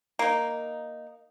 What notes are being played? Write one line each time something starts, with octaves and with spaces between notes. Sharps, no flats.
A#3 D#4